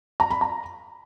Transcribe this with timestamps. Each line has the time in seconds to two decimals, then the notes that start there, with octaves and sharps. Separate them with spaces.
0.20 A#5
0.30 B5
0.41 A#5